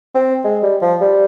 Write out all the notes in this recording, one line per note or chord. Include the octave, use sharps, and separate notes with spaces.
C4
G#3
G3
F3
G3